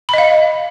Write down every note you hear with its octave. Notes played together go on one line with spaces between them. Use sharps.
D#5 F5 B5